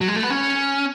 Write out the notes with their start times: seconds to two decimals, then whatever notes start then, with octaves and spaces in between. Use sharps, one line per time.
0.01 F#3
0.08 G#3
0.16 A3
0.23 B3
0.30 C#4